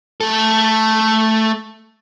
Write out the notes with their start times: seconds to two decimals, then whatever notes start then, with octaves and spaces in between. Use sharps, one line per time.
0.21 A3 A4